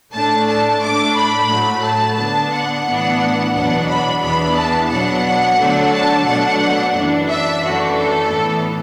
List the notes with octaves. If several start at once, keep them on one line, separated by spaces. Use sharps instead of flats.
A2 A3 D4 A5
A5
A2 A3 D4 D6
B5
A2 F#3 A3
A5
D3 B3 D4
F#5
A2 E3 B3 D4
E2 B2 F#3 B3 D4 F#5
B5
E2 E3 B3 D4 B5
A5
B2 F#3 B3 D4 F#5
D3 F#3 A3 D4
A5
B2 F#3 A3 D4 F#5
F#2 E3 D4
E5
F#2 E3 A3 D4 F#4
A4
A2 E3 B3